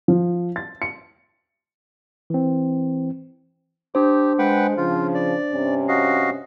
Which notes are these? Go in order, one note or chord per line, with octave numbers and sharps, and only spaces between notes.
F3
A6
C#7
E3 C4
D4 G4 C5
G#3 B4 F#5 G5
C#3 F3 F4
D5
G2 C3 C#4
F#4 D#5 F5